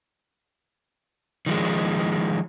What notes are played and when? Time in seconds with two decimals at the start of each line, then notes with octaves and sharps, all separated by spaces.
1.46 D#3 F3 G#3